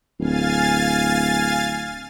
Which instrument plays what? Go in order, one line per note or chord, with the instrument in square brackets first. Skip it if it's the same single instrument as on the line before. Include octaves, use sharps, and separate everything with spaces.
[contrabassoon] D1 [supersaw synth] F5 G#5 A6